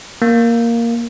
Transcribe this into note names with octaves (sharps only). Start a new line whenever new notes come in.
A#3